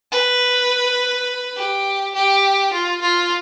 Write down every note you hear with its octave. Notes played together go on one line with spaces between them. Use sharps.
B4
G4
G4
F4
F4